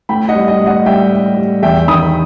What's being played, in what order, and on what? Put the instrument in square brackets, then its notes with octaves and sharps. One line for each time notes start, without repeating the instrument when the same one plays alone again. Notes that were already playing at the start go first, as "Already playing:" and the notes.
[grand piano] A2 G5 B5
D#5 F#5
G3
D#5
A2
D#5 F#5
G3 E5 G5
A2
G3
E2 E5 G5
D#3 B5 D#6